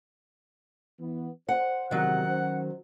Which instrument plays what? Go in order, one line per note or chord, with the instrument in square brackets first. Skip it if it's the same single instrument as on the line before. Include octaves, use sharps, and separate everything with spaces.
[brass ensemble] E3 B3
[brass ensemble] C5 [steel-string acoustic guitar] F#5
[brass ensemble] A#1 E2 C3 [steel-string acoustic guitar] D#3 F#3 [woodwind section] F#5
[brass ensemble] C#4 F#4 C5